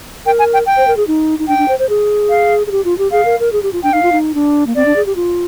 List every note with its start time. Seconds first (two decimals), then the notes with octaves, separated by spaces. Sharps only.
0.26 A#4 G5
0.39 G#5
0.54 G5
0.66 G5
0.77 C5
0.87 A#4
0.97 G#4
1.07 D#4
1.39 D#4
1.48 D4 G5
1.58 D4
1.68 C5
1.79 C5
1.89 G#4
2.29 F5
2.67 G#4
2.71 G4
2.85 F4
2.98 G4
3.11 G#4 F5
3.25 A#4
3.40 A#4
3.52 G#4
3.63 G4
3.73 F4
3.83 D4 G5
3.93 D#4 F5
4.03 F4
4.12 D#4
4.34 D4
4.67 A#3
4.75 C4 D5
4.86 D4
4.96 G#4
5.06 G4
5.16 F4